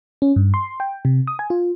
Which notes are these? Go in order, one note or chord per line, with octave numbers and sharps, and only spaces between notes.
C#4
G2
C6
G5
C3
D#6
G#5
F4